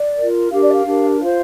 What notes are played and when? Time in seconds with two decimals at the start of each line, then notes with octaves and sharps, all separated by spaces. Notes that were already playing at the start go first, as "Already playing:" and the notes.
Already playing: D5
0.16 F4 A#4
0.50 D4 G4 A#4 F5
0.62 D5
0.73 F5
0.85 D4 G4 A#4
1.19 F4 C5 F5